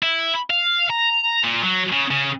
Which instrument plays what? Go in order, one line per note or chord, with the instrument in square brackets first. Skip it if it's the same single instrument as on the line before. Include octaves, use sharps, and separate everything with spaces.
[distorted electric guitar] E4
F5
A#5
A#2
F#3
C#3
C#3